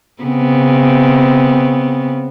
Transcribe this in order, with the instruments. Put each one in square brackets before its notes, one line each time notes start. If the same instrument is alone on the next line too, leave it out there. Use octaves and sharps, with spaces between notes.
[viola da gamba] C#3 B3 C4